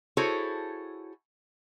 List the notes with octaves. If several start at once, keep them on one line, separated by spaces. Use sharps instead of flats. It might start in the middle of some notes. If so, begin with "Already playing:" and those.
E4 F#4 G#4 A4 C5 C#5